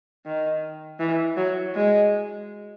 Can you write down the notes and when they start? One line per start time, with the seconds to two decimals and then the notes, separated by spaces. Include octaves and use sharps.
0.26 D#3
1.00 E3
1.37 F#3
1.75 G#3